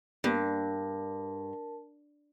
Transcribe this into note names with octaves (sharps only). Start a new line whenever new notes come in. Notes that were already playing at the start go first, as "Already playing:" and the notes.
G2 A#3 B3 G4 A#4 A5